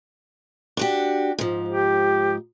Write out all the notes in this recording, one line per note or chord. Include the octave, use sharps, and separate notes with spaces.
D4 F#4 G4
G#2 F3
G4